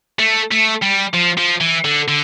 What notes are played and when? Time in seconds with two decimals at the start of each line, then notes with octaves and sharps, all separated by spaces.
0.19 A3
0.51 A3
0.82 G3
1.13 F3
1.38 F3
1.61 E3
1.85 D3
2.08 D3